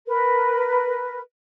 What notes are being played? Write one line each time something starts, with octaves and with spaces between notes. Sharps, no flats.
A#4 B4